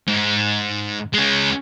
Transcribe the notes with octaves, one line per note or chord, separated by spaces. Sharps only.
G#2
G#3 C#4